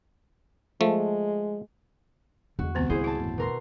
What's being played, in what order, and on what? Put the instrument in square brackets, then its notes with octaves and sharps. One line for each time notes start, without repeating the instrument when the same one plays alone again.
[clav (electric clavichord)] F3 A3 [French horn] G#3
[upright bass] E2 [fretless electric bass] D3 G#3 [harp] F#4
[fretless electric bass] C#2 A2 G3 [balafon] D#3 B3 C4
[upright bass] F#3 [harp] E4 G#4 C5
[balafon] E4 [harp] A5 D7
[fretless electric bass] G1 E2 A2
[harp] B2 A#4 C6